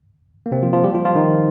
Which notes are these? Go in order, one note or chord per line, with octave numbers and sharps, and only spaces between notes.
A#3
C3 C4
F3 F4
F3 F4
G3 G4
F3 F4
F3 F4
D#3 D#4